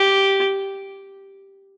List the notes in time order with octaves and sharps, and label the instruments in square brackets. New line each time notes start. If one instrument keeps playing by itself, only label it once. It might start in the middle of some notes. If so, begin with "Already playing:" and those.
Already playing: [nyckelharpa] G4